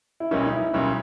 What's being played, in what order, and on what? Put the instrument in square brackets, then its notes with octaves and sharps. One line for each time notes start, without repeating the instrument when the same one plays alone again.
[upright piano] E4
[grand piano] B1 B2 G3 A#3 C#4 [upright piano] D#4
[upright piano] D#4
E4
[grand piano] B1 B2 G3 A#3 C#4